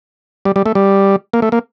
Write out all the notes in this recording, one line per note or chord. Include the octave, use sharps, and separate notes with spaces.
G3
G3
A3
G3
A#3
A3
A#3